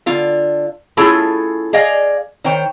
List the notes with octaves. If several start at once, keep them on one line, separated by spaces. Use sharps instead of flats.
D3 F4
A3 C#4 E4 F4 G#4 A4
G#4 D5 D#5 F5
D#3 C5 C#5 G5